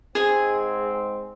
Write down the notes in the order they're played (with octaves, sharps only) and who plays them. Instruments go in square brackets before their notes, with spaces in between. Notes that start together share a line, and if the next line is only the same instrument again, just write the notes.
[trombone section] G#2 G#3 C4 [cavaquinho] G#4 G#5